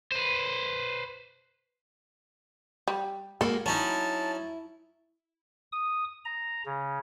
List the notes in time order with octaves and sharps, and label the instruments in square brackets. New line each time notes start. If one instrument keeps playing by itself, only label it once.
[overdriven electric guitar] B4 C5
[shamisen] G3
[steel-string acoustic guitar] G#3 A#3 F#4 [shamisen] A4
[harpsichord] F#3 C#4 D#4 [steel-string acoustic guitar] E4 [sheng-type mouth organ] A5
[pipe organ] D#6
A#5
C#3